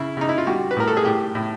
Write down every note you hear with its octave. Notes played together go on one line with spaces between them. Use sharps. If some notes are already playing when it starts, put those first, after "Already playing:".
Already playing: C#3 E4
C#3 D#4
E4
F4
G3 F#4
B4
A2 A#4
A4
G#4
A2 G4
A2